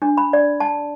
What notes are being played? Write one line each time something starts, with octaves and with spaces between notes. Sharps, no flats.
D4
B5
D5
A5